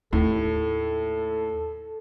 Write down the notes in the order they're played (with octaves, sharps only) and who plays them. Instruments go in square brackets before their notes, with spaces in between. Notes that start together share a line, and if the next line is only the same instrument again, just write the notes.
[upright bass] D#2 [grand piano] A2 [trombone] A4